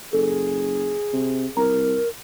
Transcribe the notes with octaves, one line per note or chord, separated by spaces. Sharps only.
F#1 G#4 A4
C3
C2 A#4 A#5